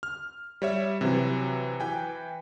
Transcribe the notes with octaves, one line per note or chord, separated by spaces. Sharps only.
F6
G3 C#5 E5
C3 E3 F#3
E3 B4 G5 G#5